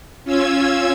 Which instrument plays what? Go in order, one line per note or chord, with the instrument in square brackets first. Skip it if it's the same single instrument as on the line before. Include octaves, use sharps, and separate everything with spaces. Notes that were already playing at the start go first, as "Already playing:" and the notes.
[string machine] C#4 F4 E6 G#6